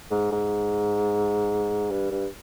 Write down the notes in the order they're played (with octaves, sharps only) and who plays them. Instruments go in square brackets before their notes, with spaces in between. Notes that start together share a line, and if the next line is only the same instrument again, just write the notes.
[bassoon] G#2
G#2
G2
G2